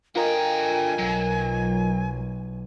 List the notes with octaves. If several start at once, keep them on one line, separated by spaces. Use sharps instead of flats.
D3 F4 A#4 D#5 G5 G#5
B1 F#3